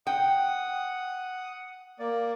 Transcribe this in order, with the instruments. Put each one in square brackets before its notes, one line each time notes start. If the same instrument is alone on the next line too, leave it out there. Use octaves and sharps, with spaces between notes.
[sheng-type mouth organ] F#5 D#6 [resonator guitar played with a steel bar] G5
[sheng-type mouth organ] A#3 D5